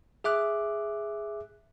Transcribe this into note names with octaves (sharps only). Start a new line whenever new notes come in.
G#4 E5 D6 F#6